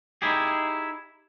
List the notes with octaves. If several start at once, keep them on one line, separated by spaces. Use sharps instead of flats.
D#4 E4 G4 G#4